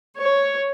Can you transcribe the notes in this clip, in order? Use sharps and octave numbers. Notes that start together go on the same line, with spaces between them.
C#5